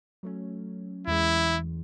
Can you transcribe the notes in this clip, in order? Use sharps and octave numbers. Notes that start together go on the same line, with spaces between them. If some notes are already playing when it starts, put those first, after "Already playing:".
F#3 A3 C#4
E2 E3 G#3 E4